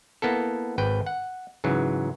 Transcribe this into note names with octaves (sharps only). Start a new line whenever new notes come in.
A#3 B3 E4 A4
G#1 B4 G5
F#5
G#2 C#3 E3 F#3